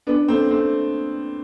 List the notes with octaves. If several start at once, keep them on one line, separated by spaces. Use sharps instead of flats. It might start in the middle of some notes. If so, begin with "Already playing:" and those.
B3 D4
A3 C4
A3 C4